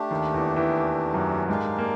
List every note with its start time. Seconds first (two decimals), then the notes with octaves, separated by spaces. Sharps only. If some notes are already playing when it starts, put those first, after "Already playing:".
Already playing: A3 D4 G4
0.11 D#2 D#3
0.34 E2 E3
0.56 E2 E3
1.14 F#2 F#3
1.48 G#2 G#3 D4 G4 A#4 D5 F5
1.78 A#3